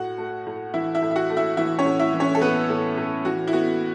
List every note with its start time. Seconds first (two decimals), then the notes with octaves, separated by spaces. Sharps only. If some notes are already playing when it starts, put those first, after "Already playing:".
Already playing: A2 F#4 F#5
0.18 A3
0.46 A2
0.74 E3 E4 E5
0.95 E4 E5
1.02 A2
1.11 E5
1.16 F#4 F#5
1.30 A3
1.37 E4 E5
1.57 E3 E4 E5
1.79 C#4 C#5
1.85 A2
1.99 E4 E5
2.13 E3
2.20 C#4 C#5
2.35 A4
2.41 A2 B3 B4
2.69 A2
2.97 A2
3.25 E3 F#4
3.47 E4
3.53 B3 F#4